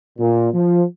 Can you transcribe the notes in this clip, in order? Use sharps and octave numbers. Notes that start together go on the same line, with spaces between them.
A#2
F3